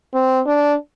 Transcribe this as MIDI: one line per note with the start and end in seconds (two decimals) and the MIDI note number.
0.14 0.40 60
0.46 0.75 62